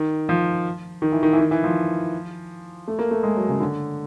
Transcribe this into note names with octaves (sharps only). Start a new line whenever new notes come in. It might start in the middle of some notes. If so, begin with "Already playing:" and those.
Already playing: D#3
F3
D#3
E3
D#3
E3
D#3
E3
F3
A3
A#3
A3
G#3
F#3
C#3
D3